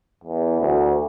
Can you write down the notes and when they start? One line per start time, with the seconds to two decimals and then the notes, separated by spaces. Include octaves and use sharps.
0.24 E2
0.61 D2